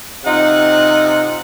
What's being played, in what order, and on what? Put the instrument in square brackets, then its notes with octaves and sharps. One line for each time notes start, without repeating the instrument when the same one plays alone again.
[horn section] C3 D#4 F4 F#5